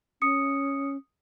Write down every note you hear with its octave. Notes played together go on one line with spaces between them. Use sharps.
C#4 D#6 C#7